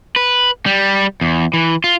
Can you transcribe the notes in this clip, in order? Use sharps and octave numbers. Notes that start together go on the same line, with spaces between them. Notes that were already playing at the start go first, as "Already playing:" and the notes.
B4
G3
E2
E3
F4